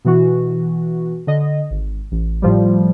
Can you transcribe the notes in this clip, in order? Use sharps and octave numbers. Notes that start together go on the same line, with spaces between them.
B2 E3 F#4
D3 D#5
G#1
A1
A2 F3 G3